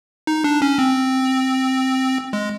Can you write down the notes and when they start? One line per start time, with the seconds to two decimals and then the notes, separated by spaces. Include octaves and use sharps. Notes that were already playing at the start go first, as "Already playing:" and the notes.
0.27 D#4
0.44 D4
0.62 C#4
0.79 C4
2.33 G#3